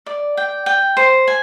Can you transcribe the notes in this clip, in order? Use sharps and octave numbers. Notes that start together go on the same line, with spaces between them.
D5
G5
G5
C5
G#5